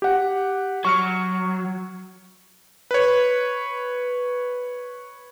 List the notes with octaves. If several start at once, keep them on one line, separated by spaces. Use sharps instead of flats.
G4 F#5
F#3 C#6 F6 C#7
B4 C#5